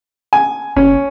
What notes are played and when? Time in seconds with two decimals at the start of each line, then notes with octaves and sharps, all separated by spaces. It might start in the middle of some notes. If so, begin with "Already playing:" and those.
0.33 G#5
0.76 F#1 C#4